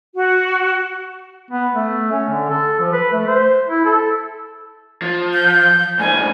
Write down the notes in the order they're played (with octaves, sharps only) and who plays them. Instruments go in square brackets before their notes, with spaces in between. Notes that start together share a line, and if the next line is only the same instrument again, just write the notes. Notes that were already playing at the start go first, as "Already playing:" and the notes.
[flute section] F#4
[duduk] B3
A3
C#4
D3
A4
F3
B4
A3
C5
E4
A4
[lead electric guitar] F3
[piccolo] G6
[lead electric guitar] F2 G#2 [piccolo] G#5